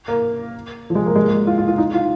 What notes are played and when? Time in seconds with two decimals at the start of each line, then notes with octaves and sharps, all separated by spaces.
0.08 A#3
0.90 F3
0.95 G#3
1.06 A#3
1.16 G#3
1.24 A#3
1.47 F4
1.58 F4
1.68 F4
1.78 D#4
1.94 F4